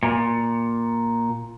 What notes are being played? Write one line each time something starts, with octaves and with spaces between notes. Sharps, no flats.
A#2